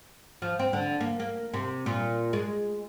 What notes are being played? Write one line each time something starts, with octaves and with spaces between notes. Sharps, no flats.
F3
C4
D3
A#3
A#3
C3
A#2
G#3